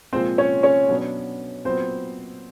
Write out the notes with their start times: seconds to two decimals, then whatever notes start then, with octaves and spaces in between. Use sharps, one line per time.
0.13 A#2 F3 G#3 C4 C5
0.38 C#4 C#5
0.63 C#4 C#5
0.89 B2 F#3 B3 D4
1.65 A#2 F#3 B3 C4 C5